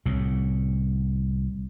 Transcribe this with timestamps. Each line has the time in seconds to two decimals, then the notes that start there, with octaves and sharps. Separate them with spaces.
0.05 C2 A2